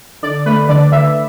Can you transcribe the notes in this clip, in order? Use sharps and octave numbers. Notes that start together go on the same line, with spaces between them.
D3 D5
A3 B4
D3 D5
D3 E5